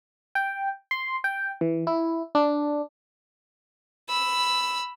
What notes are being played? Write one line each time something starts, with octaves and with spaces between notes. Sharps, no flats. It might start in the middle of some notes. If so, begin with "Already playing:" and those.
G5
C6
G5
E3
E4
D4
B5 E6